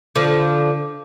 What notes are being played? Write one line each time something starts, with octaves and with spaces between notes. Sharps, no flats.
D3 F3